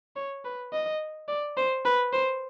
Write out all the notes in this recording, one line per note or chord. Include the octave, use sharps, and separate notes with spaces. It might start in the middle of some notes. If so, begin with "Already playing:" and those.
C#5
B4
D#5
D5
C5
B4
C5